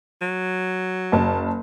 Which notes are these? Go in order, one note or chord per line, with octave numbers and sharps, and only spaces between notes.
F#3
F#1 A5